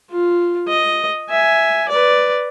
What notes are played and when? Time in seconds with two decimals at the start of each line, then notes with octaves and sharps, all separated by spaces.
0.11 F4
0.69 D#5
1.30 E5 G#5
1.89 B4 D5